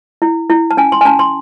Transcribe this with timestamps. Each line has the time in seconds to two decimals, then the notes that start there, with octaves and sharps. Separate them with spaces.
0.22 E4
0.50 E4
0.71 A5
0.77 C#4 G#5
0.92 C6
1.01 G#5
1.05 C#4 A5
1.19 C6